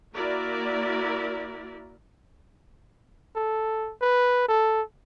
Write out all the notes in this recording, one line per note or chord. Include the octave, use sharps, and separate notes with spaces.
A#3 E4 F#4 A#4 D5
A4
B4
A4